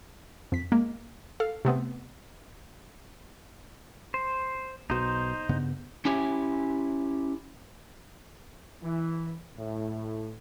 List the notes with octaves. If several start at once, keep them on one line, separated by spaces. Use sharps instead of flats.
F2 B6
G#3 A#3
A4 F5
C3 A3 B3 C4
C5
B1 B2 D#4 C5
G2 C#3 B3
C#4 E4 G4 G#5
E3
A2